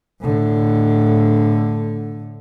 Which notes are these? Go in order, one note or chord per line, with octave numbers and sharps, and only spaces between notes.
A2 D3